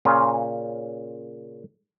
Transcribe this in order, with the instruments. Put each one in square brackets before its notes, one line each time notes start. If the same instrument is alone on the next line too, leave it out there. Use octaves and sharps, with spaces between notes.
[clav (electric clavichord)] A#2 C#3 C#4 F4